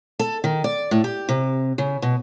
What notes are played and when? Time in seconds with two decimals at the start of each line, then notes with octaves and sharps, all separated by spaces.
0.19 A4
0.44 D#3
0.64 D5
0.91 A2
1.04 G4
1.29 C3
1.78 C#3
2.02 B2